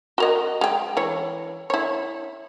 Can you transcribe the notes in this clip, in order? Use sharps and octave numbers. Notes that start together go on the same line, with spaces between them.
F#4 A#4 D#5
G#3 G5
E3 C#5
E4 C#5